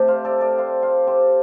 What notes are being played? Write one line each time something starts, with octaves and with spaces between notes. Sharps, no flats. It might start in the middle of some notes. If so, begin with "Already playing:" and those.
Already playing: C3 A3 G4 D5
C5 F5
A4 D5
A4 D5
C5 F5
C5 F5
G4 C5